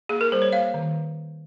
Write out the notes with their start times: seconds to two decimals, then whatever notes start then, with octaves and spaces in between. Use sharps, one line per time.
0.09 A#3 G#4
0.21 A#4
0.32 G3 C5
0.42 C#5
0.53 A#3 F5
0.74 D#3